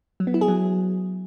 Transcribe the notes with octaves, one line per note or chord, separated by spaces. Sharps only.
F#3
B3
E4
G#4
F#3